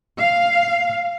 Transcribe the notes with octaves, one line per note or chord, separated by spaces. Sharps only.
F5